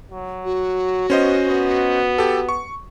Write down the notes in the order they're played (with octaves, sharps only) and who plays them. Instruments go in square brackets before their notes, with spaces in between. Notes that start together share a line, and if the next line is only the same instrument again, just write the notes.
[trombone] F#3
[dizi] F#4
[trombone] B3 [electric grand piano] C#4 C5 D#5
[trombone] B3
[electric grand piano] G4 A4
C#6